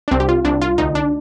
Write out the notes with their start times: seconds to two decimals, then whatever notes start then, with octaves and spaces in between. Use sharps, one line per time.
0.08 D4
0.11 C2 C4
0.20 G4
0.29 F4
0.45 C2 D4
0.62 F4
0.78 D2 D#4
0.95 D4